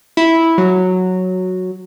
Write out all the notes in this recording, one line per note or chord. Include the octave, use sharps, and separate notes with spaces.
E4
F#3